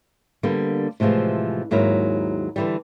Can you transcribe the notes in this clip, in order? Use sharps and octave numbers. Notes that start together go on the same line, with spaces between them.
D3 G3 A#3 B3
A2 C3 E3 F3 G#3
D#2 G#2 F#3 E4 A#4
D3 E3 G3